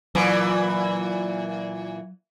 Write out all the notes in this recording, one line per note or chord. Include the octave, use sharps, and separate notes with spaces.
A#2 E3 F#3